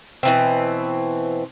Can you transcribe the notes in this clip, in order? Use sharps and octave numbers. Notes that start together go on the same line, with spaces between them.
B2 E3 C4